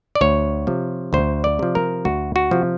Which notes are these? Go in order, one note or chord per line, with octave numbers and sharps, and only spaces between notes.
D5
D2 C#5
C3 F3
D2 C5
D5
C3 F3
A#4
D2 F#4
F#4
C3 F3